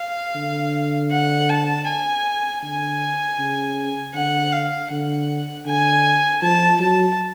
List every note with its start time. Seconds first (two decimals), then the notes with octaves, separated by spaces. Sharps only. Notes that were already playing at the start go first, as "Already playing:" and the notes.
Already playing: F5
0.35 D3
1.11 F#5
1.49 A5
1.87 G#5
2.62 D3 G#5
3.38 C#3
4.14 D3 F#5
4.52 F5
4.90 D3 F#5
5.66 D3 G#5
6.42 F3 A5
6.80 F#3 A5